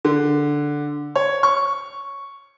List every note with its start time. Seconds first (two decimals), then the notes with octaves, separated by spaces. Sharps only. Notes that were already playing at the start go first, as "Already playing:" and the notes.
0.05 D3
1.15 C#5
1.43 C#6